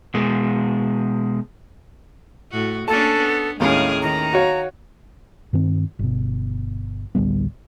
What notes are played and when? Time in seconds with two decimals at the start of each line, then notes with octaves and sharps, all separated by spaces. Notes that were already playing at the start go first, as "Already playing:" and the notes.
0.14 B2 G#3
2.51 A2 F#4
2.88 A#3 C#4 D4 A4 A5
3.18 B3
3.60 D#2 A2 G#3 C#4 G#4 A#4 F5
4.02 D#3 A#5
4.33 F#4 C#5 F5
5.53 G2 D#3 C4
5.99 G1 B2
7.15 A1 D2 G3 B3